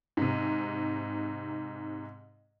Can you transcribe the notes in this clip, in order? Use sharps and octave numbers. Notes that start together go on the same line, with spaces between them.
G#2 C3